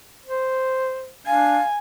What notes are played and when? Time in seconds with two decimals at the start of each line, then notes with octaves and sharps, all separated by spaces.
0.26 C5
1.27 D4 F5 G#5